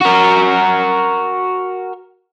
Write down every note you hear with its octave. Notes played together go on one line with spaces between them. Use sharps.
F#4 A#4